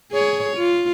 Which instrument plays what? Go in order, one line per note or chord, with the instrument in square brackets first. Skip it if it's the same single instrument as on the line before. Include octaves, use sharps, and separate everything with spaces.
[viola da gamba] G#4 C#5
F4